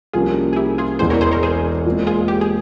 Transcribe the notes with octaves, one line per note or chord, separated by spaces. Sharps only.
C2 C3 F3 A#3 C#4 F4 G#4
G#4
E4 G4
F4 G#4
E1 E2 E3 G#4 C5
A#4 C#5
G#4 C5
A#4 C#5
G#4 C5
A#2 G#3 C4
F4 G#4
G4
G#4